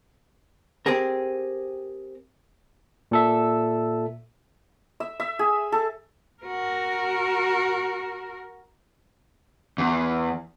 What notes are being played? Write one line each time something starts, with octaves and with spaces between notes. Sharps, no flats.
C4 G4 G#4 A#4
A#2 A4 E5
E5
E5
G#4
A4
F#4 A#4
E2